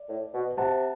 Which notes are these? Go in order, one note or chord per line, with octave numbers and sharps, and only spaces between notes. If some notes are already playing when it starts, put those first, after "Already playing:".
Already playing: D5
A2
B2
C3 F#5 A5